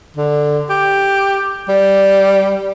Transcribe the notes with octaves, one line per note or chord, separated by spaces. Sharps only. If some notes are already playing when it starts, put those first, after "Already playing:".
D3
G4
G3